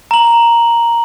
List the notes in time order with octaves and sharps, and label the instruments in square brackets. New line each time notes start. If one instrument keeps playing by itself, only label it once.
[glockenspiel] A#5 F#7